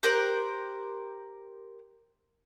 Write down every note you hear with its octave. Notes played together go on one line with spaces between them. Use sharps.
G4 A#4 C5 F#6